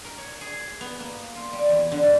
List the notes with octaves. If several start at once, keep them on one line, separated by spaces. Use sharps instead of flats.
A#4
C#5
G#4
B3
A#3
F4
G3
E2
D3
G#2